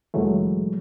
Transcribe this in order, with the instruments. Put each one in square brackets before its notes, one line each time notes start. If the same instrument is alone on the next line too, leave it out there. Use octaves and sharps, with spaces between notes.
[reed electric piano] D2 A#2 E3 F#3 G#3 A3